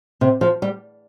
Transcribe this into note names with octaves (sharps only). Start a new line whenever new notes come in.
C3
F3
G3